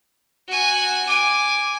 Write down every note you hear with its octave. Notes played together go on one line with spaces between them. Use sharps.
F#4 G#5
G#5 D6